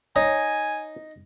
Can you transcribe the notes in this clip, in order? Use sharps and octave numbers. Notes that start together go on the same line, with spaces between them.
D#4 C#5 G#5